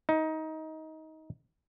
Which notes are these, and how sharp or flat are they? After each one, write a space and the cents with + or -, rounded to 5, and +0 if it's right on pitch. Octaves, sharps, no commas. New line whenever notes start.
D#4 +20